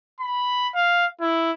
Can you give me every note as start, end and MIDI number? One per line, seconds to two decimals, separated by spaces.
0.20 0.68 83
0.75 1.07 77
1.21 1.52 64